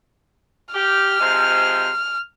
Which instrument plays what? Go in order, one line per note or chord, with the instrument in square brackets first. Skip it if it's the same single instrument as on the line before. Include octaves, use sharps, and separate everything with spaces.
[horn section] G4 [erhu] F6
[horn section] C3 F3 G#3